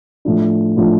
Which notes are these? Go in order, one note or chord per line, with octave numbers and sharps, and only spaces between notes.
A2 F3 D4
A2 F3 D4